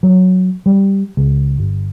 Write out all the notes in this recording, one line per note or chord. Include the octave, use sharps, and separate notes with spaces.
F#3
G3
C#2
G1